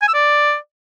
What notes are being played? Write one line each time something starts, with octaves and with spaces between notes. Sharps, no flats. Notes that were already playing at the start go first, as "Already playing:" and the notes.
G#5
E6
D5